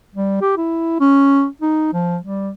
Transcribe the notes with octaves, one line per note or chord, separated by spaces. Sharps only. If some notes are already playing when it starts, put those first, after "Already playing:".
G3
G4
E4
C#4
D#4
F3
G3